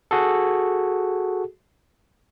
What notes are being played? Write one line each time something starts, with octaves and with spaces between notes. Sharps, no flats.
F#4 G#4 A4